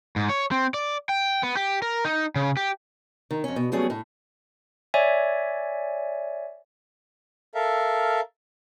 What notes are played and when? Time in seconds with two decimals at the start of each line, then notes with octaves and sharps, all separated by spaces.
0.16 G#2
0.29 C#5
0.51 C4
0.74 D5
1.09 G5
1.43 B3
1.57 G4
1.82 A#4
2.05 D#4
2.36 C#3
2.57 G4
3.31 D#3
3.44 F2 C#4
3.56 B2
3.72 F#3 G3 A3 B3 C#4 G#4
3.90 A2
4.94 C#5 D5 E5 G#5
7.55 A4 A#4 E5 F5